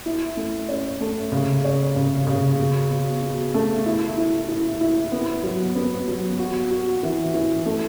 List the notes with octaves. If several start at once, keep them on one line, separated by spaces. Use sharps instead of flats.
E4
A3
C#4
A3
C#3
C#4
C#3
C#3
B2
B2
B2
A3
E4
E4
E4
E4
B3
F#3
B3
F#3
F#4
F#4
E3
E3
A3